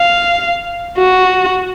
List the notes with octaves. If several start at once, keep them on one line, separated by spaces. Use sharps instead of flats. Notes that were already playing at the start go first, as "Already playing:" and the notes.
Already playing: F5
F#4